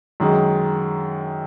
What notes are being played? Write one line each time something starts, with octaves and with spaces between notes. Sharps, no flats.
F#2 D#3 G#3